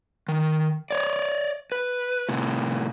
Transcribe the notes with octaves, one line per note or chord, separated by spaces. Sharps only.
D#3
C#5 D5
B4
A2 C3